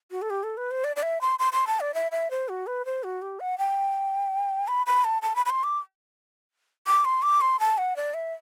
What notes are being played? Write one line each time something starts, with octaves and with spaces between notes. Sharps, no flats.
F#4
A4
G4
A4
B4
C5
D5
D5
E5
C6
C6
C6
A5
D5
E5
E5
C5
F#4
B4
C5
F#4
G4
F#5
G5
B5
B5
A5
A5
B5
B5
C6
D6
D6
C6
D6
C6
A5
F#5
D5
E5